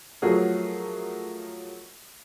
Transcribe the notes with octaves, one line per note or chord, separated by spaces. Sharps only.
F3 F#3 A3 F#4 G#4 A#4